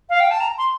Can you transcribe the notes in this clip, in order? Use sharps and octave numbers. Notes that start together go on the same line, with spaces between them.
F5
G5
A5
A#5
C6